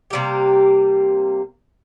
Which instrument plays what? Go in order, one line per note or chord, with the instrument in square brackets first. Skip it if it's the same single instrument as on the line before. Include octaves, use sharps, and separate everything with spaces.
[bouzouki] C3 G3 A#3 G4